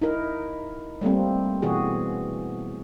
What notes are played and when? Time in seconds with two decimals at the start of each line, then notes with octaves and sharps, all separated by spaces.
0.01 D#4 E4 A#4
1.01 G3 A3 A#3 C4
1.62 B2 E3 F#4 G#4